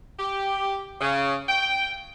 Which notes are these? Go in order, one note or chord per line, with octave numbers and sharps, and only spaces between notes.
G4
C#3
G5